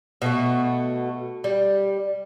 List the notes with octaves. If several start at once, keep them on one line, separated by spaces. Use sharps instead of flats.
B2 A3 F#4
G3